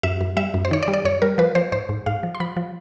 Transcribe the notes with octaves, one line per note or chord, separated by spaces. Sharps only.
F#2 E5
F#2
G3 E5
F#2
C5
D#3 C#5
D5
G3
D5
F#2 C#5
G3 A#4
F3 B4
F3 C5
G#2 C5
G#2
G#2 F5
F3
C6
F3 B5
F3